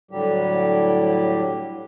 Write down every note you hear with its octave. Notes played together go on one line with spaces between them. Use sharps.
A2 D3 F#3 G3 G4